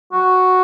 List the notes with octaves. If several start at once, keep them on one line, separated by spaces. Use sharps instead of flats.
F#4